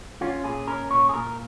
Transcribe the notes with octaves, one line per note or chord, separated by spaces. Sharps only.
C#4 F4
A#2 G#4
C#4 A#4
A#2 C#5
G#4
A#2 A#4